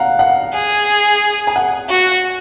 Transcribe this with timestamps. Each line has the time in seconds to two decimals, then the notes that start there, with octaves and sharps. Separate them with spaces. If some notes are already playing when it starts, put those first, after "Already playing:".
Already playing: F5 F#5 A#5
0.19 F#5
0.54 G#4
1.47 G#5
1.56 F#5
1.90 F#4